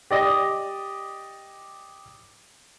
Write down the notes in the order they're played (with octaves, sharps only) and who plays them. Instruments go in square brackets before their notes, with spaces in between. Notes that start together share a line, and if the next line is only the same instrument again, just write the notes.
[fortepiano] G4 D5 D#5